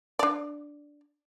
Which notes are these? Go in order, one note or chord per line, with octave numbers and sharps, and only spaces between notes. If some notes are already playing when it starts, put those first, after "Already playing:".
D4 D5